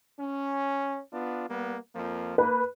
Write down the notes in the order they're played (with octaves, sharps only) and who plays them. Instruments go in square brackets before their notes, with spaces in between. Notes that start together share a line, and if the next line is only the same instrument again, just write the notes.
[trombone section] C#4
B3 D4 F4
G3 A#3 B3
F2 F3 A#3
[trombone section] A#3 [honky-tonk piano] B4